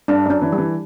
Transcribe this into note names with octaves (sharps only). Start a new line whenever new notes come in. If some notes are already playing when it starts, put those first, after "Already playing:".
G2 D4
F#2 D4
E3
G3
E3